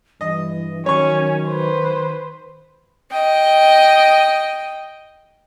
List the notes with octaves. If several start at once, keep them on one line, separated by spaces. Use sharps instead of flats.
G2 E3 D#5
D#3 F#3 C#4 C#5 C#6
B4 C5
D#5 G5